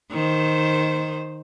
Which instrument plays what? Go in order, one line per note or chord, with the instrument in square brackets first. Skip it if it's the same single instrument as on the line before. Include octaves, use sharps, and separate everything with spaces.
[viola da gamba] D#3 C5